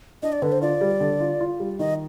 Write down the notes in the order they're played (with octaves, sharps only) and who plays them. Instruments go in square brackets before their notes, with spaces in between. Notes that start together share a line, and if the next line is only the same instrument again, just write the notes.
[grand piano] D4 [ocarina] D#5
[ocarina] D5
[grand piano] D3 [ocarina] B4
[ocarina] C5
[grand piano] F4 [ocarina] D5
[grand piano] G3
D3
F4
F4
G3
[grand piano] D#3 [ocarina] D#5